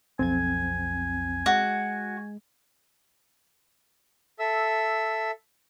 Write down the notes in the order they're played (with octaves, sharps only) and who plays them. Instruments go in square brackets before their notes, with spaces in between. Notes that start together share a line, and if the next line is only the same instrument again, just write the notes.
[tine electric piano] B1 F2 G#6 [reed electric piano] C4 [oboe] G#5
[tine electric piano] G#3 [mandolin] F#4
[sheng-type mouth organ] A4 E5 E6